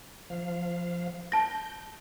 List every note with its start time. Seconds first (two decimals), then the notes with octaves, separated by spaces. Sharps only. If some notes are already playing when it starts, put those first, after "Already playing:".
0.30 F3 F5
1.32 A5 G6 A#6